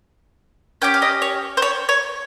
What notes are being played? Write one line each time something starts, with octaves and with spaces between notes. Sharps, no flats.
C#4 G4 G5
F5
D#5
C#5
C5
C#5
C#5